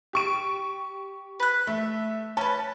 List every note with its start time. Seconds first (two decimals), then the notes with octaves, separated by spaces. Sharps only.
0.13 G4 C#6 D7
1.40 B4 F#6
1.67 A3 E5
2.37 C#4 B4 A5